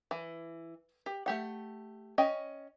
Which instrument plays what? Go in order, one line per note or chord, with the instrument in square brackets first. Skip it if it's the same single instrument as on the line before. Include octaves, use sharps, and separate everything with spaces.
[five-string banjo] E3
G4
A3 G4 F#5
C#4 D#5 G5